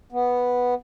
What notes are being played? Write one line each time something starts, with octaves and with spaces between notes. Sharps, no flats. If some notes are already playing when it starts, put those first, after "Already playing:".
B3